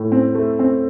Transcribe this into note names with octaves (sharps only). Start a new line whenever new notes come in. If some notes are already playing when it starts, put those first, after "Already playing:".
Already playing: A2 A3
C4
A3
C4